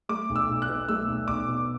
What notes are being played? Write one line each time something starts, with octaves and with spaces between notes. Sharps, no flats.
A3 D6
B1
E6
B1
F#6
B2
A3 E6
B1
B1 D6
B2